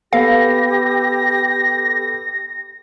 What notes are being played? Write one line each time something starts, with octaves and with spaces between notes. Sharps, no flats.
B3 G4 A4 F5 A#6